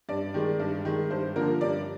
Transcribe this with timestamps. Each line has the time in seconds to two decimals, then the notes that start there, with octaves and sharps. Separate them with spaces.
0.09 G2 D5
0.34 D#3 G#3
0.60 G2
0.85 D#3 G#3
1.10 G2 C5
1.36 D3 F3 A#3 A#4
1.61 G2 D5